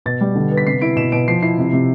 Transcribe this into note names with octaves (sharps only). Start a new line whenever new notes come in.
B2 A6
G3
D3
B3
B6
C3 C7
E4 D7
B2 E7
B2 D7
F3 C7
E4 C7
C3
C3